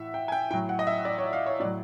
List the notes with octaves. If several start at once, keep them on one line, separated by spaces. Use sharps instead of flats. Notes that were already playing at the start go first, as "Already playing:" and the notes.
Already playing: A2 E3 E5 F#5
G5
G#5
G5
A2 F#3 G5
F#5
D#5
E5
D5
C#5
F5
C#5
A2 D5
F#3